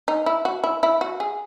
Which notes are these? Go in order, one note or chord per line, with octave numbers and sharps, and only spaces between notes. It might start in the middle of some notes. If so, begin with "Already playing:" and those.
D#4
E4
F#4
E4
E4
F#4
G#4